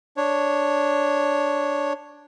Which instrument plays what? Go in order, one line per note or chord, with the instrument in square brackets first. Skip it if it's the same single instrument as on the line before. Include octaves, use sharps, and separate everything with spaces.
[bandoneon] D4 C#5